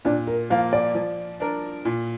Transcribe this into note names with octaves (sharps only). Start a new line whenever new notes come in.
A#2 D4
A#4
F3 A#3 F5
D5
F3
D4 A#4
A#2